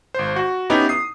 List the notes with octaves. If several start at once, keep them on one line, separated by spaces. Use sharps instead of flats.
G#1 C5
F#4
B3 C#4 D#4 E4 G4
D#6 C7